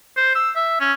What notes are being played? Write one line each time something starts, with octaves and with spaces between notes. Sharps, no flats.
C5
E6
E5
C#4